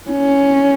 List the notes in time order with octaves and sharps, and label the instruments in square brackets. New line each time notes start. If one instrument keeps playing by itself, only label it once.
[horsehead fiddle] C#4